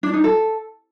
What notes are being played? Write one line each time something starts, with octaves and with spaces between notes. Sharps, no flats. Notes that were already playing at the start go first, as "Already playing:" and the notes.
D4
D#4
A4